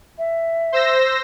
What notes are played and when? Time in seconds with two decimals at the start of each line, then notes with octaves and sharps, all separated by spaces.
0.18 E5
0.72 C5 E6 A#6